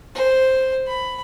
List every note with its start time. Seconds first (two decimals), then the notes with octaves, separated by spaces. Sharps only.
0.15 C5
0.87 B5